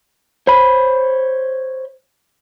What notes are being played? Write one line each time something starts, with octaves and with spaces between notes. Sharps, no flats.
C5 C#5 B5